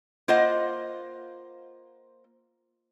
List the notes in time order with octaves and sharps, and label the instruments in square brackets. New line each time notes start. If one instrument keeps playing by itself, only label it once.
[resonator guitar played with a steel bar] A#3 F4 C5 D#5 F#5